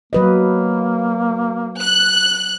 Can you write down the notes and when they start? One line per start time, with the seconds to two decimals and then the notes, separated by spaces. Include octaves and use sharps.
0.13 F#3 A#3 B4 D#5
1.80 F#6